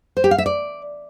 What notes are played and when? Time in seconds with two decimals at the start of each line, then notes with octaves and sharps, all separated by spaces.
0.17 C5
0.24 G4
0.31 F5
0.38 E5
0.46 D5